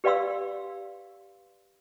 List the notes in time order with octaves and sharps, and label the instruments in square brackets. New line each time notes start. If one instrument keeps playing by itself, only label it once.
[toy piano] G4 B4 D5 F5 C6 E6